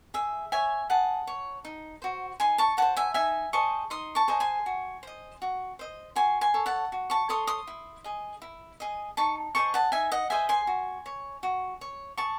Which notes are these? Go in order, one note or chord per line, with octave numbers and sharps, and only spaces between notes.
G#4 E5
C#5 E5 G#5
G#4 F#5 A5
C#5
D#4
F#4 C5
D#4 G#5 C6
A5 C#6
F#4 C5 F#5 A5
E5 G#5
D#4 E5 G#5
G#4 C5 D#5 A5 C#6
D#4 C6 D#6
A5 C#6
G#4 C5 D#5
G#5 C6
F#4
C5 D#5
F#4
C5 D#5
F#4 G#5 C6
G#5 C6
A4 C#5
F#5 A5
F#4
A5 C#6
A4 C#5 C6 D#6
C6 D#6
E4
G#4 D#5
E4
G#4 D#5
D#4 A5 C#6
G#4 C5 D#5 A5 C#6
F#5 A5
D#4 E5 G#5
D#5 F#5
G#4 C5 D#5 E5 G#5
G#5 C6
F#4
C#5
F#4
C#5
G#4 A5 C#6